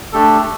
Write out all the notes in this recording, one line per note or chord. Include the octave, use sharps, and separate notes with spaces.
A3 D4 G4 A4